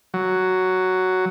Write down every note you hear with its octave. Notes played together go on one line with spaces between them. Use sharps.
F#3